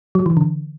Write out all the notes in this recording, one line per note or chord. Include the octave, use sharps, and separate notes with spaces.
F#3
E3
D3